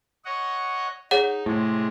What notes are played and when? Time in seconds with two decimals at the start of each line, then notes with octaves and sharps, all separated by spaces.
0.25 C#5 D#5 F#5
1.11 D#4 G#4 C#5 F#5
1.46 A2 C3 G#3